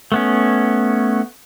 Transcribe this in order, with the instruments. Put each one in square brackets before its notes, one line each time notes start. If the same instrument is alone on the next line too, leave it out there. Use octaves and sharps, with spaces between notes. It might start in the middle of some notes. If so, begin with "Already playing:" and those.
[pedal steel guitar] A3 B3 C#4